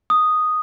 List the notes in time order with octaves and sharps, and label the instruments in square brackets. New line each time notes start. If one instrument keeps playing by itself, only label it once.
[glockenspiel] D#6